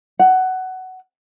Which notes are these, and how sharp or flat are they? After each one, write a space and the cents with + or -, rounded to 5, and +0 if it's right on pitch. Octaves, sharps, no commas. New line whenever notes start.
F#5 +15